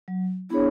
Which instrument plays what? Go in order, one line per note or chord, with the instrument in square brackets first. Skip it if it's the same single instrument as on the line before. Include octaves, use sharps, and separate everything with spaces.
[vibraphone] F#3
[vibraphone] B3 D4 G#4 C#5 [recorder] E4